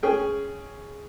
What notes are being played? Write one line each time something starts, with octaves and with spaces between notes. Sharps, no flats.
C#4 G#4 G5